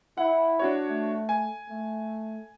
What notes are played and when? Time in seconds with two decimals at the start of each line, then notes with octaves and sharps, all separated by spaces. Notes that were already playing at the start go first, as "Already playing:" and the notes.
0.18 E4 F#5
0.59 D4 F#4 C#5
0.88 A3
1.29 G#5
1.69 A3